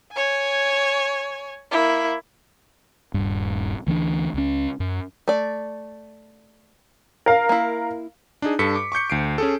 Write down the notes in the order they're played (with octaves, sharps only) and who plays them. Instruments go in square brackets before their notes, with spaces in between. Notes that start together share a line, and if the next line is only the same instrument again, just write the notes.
[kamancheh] C#5 G#5
A#3 E4
[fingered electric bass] D#1 G2
D2 E3 B3 D4
C#2 C#4
F#2
[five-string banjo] A3 D5
[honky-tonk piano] A#4 F5
[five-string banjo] A#3 E4
[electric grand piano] D4 D#4 G#4
G2 A4 B6 C#7
D6
C#6 D6 G6 C#7
D2 C7 D7
C#4 G#4 A4